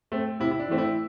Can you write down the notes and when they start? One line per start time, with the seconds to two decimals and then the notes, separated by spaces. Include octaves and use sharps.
0.12 A3 C4
0.40 C3 E4
0.51 E4
0.60 D4
0.68 E3 A3 C4
0.78 E4